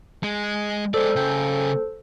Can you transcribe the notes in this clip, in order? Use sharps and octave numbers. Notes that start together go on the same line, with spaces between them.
G#3
G#3 A4 C5 D5
C#3 G5